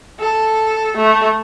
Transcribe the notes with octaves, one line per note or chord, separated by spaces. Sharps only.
A4
A3